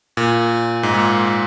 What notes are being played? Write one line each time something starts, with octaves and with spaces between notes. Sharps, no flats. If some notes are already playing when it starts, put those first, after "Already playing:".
A#2
G#2
A#2